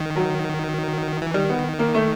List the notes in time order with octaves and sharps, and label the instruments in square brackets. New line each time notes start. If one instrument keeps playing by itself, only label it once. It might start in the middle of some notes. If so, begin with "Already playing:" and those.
Already playing: [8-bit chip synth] D#3
[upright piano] F#3
[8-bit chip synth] E3
[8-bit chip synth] D#3 [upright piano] G3
[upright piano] B3
A#3
A3